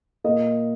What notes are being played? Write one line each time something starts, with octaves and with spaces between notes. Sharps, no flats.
A#2 A#3 D#5